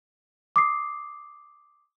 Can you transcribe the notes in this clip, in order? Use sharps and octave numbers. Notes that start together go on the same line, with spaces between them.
D6 D#6 C7